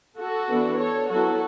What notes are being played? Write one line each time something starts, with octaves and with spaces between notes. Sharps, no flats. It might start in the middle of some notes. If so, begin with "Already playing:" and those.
F#4 A4
E3 B3 D4
A4 C#5
F#3 B3 E4 F#4 A4